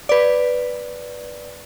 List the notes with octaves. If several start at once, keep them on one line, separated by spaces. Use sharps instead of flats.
B4 D5